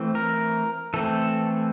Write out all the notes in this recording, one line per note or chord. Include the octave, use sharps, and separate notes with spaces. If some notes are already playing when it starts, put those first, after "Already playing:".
Already playing: E3 A3 C4
A#4
E3 A3 C4 A4